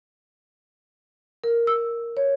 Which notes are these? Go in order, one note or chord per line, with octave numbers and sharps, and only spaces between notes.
A#4
E6
C#5